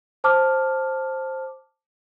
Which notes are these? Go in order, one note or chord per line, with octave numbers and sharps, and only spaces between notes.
C5 A5 D6 F6